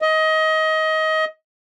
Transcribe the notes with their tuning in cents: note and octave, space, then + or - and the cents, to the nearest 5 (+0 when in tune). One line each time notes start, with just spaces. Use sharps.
D#5 +25